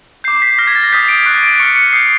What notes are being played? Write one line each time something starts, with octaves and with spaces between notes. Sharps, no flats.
D6 G6 C7
B6
D6 F6 A#6
G#6
A6
A#6
D#6 G6 B6
D7
C#6 F#6
D7
C#6 F6 C#7
C#7
D#6 G6 C7